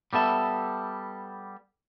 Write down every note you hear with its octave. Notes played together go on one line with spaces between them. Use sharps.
G3 B3 A4 E5